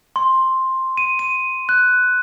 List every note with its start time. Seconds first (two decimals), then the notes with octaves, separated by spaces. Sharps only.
0.16 C6
0.97 D#7
1.19 D#7
1.69 F#6